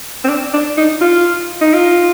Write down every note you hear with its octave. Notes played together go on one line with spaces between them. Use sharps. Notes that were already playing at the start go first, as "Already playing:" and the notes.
C4
D4
D4
D#4
F4
D#4
F4